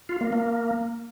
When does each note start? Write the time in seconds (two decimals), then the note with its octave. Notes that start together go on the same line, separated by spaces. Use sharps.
0.09 F4
0.21 A#3
0.32 A#3